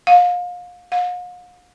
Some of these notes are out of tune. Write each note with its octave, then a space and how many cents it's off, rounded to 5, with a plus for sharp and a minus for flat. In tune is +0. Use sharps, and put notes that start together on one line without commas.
F5 +35
F5 +45